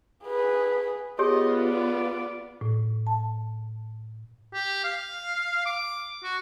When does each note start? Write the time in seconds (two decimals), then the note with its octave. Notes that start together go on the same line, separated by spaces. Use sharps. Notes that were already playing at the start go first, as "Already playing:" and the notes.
0.24 G#4 B4
1.19 B3 F4 G4 G#4 C#5 D#5
1.61 D5
2.61 A2
3.07 A5
4.54 G4
4.84 F5
5.66 D6
6.23 F#4